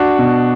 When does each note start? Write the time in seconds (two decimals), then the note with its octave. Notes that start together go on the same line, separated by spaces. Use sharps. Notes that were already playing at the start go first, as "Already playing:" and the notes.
Already playing: D4 F#4
0.19 B2